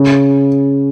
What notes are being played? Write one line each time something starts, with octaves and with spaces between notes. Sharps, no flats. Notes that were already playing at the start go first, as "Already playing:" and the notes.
Already playing: C#3